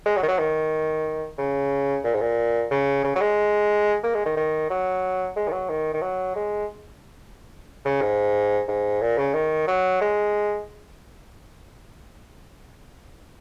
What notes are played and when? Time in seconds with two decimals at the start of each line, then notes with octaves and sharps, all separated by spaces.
0.06 G#3
0.17 F#3
0.23 D#3
0.28 F#3
0.39 D#3
1.38 C#3
2.04 A#2
2.14 G#2
2.21 A#2
2.71 C#3
3.04 C#3
3.15 F#3
3.21 G#3
4.03 A#3
4.15 G#3
4.25 D#3
4.36 D#3
4.70 F#3
5.36 G#3
5.48 D#3
5.52 F#3
5.69 D#3
5.94 D#3
6.02 F#3
6.36 G#3
7.85 C#3
8.01 G#2
8.68 G#2
9.01 A#2
9.18 C#3
9.34 D#3
9.68 F#3
10.01 G#3